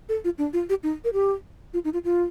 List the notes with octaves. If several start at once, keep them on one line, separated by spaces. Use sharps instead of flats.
A4
F4
D4
F4
G4
D#4
A#4
G4
F4
D#4
F4
F4